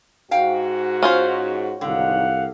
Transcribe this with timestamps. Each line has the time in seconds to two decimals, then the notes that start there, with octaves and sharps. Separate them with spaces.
0.31 G#2 F#4 F5 G5
1.03 C#4 F4 C5
1.81 C2 G#2 D3 D#3 F#3 F5 F#5